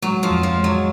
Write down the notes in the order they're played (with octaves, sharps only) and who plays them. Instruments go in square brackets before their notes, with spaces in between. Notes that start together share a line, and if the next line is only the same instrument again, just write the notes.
[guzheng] F#3 [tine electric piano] G#3
[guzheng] F3
[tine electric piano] F2
[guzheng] F3
[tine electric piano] G#3
[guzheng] F#3